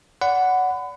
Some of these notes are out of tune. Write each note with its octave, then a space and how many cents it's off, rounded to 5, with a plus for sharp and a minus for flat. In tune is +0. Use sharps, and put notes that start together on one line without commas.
D5 -35 F#5 +0 B5 +30